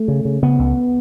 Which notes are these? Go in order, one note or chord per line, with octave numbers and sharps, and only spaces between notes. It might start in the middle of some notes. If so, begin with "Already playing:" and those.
Already playing: A3
C#3
C#3
C#3 B3
C#2